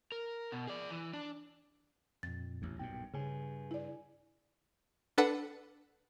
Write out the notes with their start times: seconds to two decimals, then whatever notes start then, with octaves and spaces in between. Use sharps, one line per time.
0.12 A#4
0.52 B2
0.67 G#4 D5
0.90 E3
1.14 D4
2.23 F2 A#2 A6
2.62 A1 D#2
2.79 B1 G2 A#2 G5
3.14 G2 C#3 G#4 G#5
3.71 E4 D5
5.18 D4 A4 B4 F#5